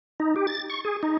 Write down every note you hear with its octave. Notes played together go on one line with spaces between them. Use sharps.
D#4
G4
A6
C#6
G#4
D#4